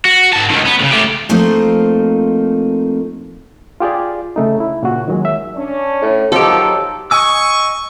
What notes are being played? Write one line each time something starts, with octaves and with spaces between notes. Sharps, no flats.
F#4
G#2 A5
C#2 D#3
B3
A2 C#3
A3 G4
F3 A3 A#3 C4 D#4
F4 G4 G#4 D5
C#3 A3 D#4
E4
A#2 C#3 F#4
D#3 F#3 G#3
E5
C#4 D4
A2
D#3 F3 F#3 D#4 G4 A4
D#5 G#5 C#6 E6